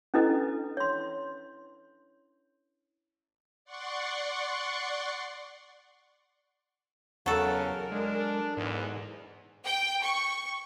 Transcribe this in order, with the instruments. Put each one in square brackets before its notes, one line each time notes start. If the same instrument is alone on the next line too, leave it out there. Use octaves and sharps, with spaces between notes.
[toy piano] C#4 D4 E4 A4 B4 D#5
C#5 C6
[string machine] D5 F#5 C6 C#6
[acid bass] E2 [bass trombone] C#3 [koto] F#3 A4 [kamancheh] A#4
[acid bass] G#3 [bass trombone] D4
[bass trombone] E2 [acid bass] G#2
[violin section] G5
C#6